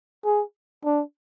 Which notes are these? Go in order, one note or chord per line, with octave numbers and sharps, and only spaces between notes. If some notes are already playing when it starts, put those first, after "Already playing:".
G#4
D4